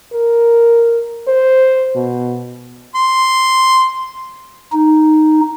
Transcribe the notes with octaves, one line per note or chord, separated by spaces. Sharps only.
A#4
C5
B2
C6
D#4